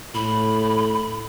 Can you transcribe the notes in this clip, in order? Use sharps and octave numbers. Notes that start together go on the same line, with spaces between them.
A2 B5